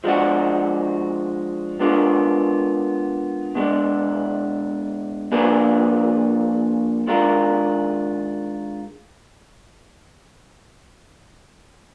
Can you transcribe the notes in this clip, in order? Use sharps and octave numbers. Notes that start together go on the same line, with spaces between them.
F3 G#3 D4 F#4
G#3 B3 D4 F4 A#4
B2 G#3 D4
F3 A#3 D4 G#4 B4
D#3 G#3 D4 F4 A#4